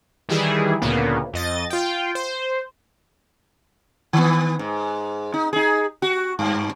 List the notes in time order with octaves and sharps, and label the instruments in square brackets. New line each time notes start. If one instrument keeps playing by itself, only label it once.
[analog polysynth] D#3 E3 G3 E4 G#4
D2 A#2 C#3 A#3 B3
F2 D#5 A6
F4 G5
C5
[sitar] D#3 B3
G#2
D#4
D#4 G#4
F#4
G2